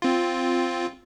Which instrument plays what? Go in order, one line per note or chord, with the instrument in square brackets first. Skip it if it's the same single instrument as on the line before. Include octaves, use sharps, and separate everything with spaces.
[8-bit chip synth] C4 F4